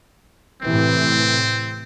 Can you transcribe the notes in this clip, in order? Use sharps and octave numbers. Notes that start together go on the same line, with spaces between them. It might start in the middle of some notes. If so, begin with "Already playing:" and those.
A2 C3 E3 C4